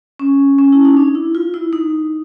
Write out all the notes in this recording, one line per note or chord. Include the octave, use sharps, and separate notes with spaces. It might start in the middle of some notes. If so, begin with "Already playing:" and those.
C#4
C#4
E4
D#4
D4
E4
F4
E4
D#4